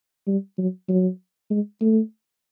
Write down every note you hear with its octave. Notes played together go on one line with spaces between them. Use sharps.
G3
F#3
F#3
G#3
A3